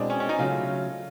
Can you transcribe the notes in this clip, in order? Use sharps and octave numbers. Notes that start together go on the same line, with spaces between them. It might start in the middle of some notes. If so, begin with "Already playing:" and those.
Already playing: B2 G#3 C4 D4 E4 G#4
C#4
C#4
D#4
C#3 F#3 A3 F4